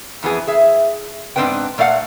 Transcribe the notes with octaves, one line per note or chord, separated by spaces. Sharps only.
F2 E3 B3 G#4
G#4 E5
G#2 B3 C4 D4 B4 G5
A#2 A3 D5 F5 F#5